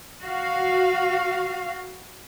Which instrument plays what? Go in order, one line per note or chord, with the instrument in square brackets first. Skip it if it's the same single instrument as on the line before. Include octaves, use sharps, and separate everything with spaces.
[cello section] F#4 F5